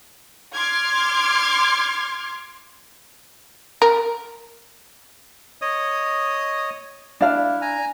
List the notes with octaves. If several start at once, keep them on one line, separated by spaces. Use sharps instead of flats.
C6 D6 F6 G#6
A#4
C#5 D#5 D#6
D4 E4 F5
G#5 A#5